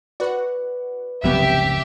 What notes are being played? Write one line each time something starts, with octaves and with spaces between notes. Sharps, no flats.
F#4 B4 D5 F#5
F1 C#2 G#2 C3 F#3 B3 G4 E5